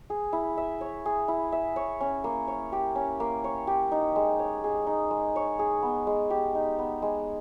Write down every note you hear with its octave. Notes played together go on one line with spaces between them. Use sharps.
G#4
E4
E5
C#5
G#4
E4
E5
C#5
C#4
A#3
C#5
G4
C#4
A#3
C#5
G4
D#4
G#3
C#5
G#4
D#4
G#3
C#5
G#4
B3
G#3
G4
D#4
B3
G#3